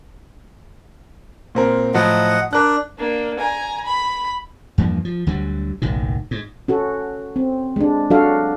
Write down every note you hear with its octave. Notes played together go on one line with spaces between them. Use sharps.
A#2 C4 A#4
A2 F3 F#3 D#5 F#5
D4 A#4 F#6
A#3 D4
G#5 A#5
B5
E2 G2 F3 A#3
F3
D2 D3 F#3 G3
F#1 B1 A2 D#3
G#2
C#4 F#4 A4
C4
G#3 D4
F#3 D4 F#4 A4 F5